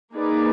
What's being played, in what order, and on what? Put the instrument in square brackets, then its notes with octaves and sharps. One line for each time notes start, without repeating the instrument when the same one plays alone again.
[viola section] A#3 D#4 G#4 B4 D5